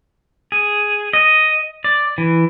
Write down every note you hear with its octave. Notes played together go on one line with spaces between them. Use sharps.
G#4
D#5
D5
E3